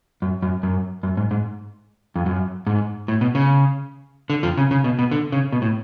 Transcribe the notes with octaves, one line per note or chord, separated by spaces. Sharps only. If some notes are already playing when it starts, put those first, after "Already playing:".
F#2
F#2
F#2
F#2
G#2
G#2
F2
F#2
G#2
A2
B2
C#3
D3
F2 F3
C#3
C#3
B2
B2
D3
C#3
B2
A2